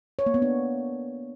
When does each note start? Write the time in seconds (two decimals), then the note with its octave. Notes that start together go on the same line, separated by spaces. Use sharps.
0.19 C#5
0.26 A#3
0.34 B3
0.42 D4